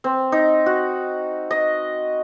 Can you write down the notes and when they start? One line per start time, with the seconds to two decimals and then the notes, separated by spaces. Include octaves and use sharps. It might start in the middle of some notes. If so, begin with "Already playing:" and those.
0.04 C4
0.32 D#4
0.66 F#4
1.51 D#5